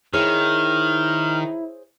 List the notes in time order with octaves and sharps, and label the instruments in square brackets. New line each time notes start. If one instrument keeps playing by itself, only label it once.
[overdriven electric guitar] D#3 [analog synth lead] E4 [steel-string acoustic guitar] G#4 C5 C#5 [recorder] F6